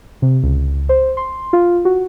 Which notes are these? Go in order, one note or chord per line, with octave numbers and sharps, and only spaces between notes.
C3
C#2
C5
C6
F4
F#4